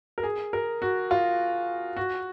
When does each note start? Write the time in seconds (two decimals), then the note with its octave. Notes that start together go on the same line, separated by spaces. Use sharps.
0.18 A#4
0.23 G#4
0.53 A#4
0.82 F#4
1.11 F4
1.97 F#4